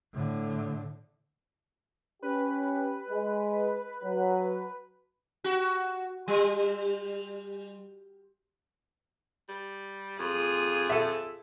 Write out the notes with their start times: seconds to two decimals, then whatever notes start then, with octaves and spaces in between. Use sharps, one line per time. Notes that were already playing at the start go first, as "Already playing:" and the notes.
0.14 A2 D3
2.22 C#4 G4 B4
3.10 G#3
4.03 F#3
5.44 F#4
6.28 G3
9.49 G3
10.19 F2 F4 G#4
10.90 A4 E5